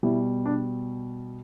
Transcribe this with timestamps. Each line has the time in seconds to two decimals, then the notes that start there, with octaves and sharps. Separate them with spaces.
0.03 B2 G3 E4
0.46 D4